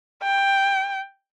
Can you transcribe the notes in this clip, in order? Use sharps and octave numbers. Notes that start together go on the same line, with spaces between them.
G5